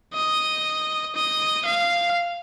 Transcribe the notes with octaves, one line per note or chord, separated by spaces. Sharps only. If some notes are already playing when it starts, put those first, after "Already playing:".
D#5
D#5
F5